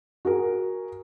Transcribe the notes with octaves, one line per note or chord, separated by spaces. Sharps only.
F#4 G#4 A#4